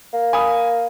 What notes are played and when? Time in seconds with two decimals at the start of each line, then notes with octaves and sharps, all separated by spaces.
0.13 A#3
0.33 G#5 B5 D#6